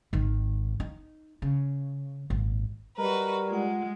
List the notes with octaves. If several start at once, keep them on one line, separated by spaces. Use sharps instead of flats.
G#1 D#3
D#4
C#3
G#1 A#2
G3 F#4 A#4 B4 D#5
G#3 F4 F#5